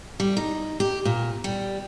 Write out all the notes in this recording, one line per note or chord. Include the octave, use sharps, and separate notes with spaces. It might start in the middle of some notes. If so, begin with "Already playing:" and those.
G3
D#4
G4
A#2
G3